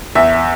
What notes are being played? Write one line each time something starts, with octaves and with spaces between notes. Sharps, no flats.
E2 E5